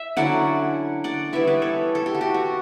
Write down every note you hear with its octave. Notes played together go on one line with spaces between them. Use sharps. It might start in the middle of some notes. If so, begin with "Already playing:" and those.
Already playing: E5
D3 F#3 C#4 E4 D5 F#5
D5 F#5
E3 G3 B3 E4 C#5 E5
B4 D5
A4 C#5
A4
G4
F#4
G4
F#4